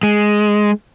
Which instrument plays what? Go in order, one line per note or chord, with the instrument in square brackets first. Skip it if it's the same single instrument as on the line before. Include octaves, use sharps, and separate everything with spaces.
[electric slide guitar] G#3